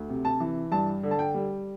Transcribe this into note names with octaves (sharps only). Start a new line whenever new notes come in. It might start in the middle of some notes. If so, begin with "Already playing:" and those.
Already playing: D2
C3
A5
E3
G2 A5
D3
A5
G5
G3